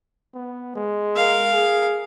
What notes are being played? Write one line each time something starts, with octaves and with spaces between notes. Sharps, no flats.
B3
G#3
A#4 F5
G#4